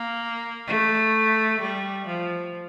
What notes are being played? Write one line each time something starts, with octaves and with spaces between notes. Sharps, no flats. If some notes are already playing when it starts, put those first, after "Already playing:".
Already playing: A#3
A3
G3
F3